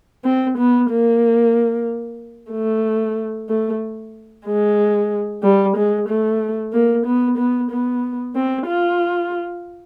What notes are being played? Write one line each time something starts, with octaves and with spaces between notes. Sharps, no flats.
C4
B3
A#3
A3
A3
G#3
G3
G#3
A3
A#3
B3
B3
B3
C4
F4